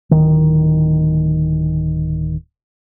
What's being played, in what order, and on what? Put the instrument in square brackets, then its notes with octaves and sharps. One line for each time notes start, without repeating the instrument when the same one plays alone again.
[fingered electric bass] D1 D#3